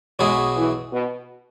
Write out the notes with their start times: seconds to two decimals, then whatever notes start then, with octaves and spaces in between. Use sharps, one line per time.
0.19 B1 B2 F#3 G#3 E4 G#4
0.57 E3
0.93 B2